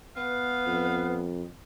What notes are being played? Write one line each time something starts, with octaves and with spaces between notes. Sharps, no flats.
B3 B4 F5
F2